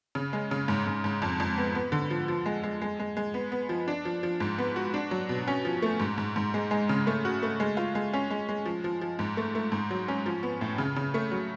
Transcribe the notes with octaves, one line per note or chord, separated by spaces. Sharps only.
C#3
G#3
C#3
G#2
G#2
G#2
F2
F2
B3
B3
D3
F3
F3
G#3
G#3
G#3
G#3
G#3
B3
B3
F3
D4
F3
F3
G#2
B3
F#4
D4
F#3
B2
C#4
F3
A3
G#2
G#2
G#2
G#3
G#3
C#3
A3
F#4
A3
G#3
F4
G#3
C#4
G#3
G#3
F3
F3
F3
G#2
A3
A3
G#2
F#3
C#4
F3
B3
A2
C#3
C#3
A3
F#3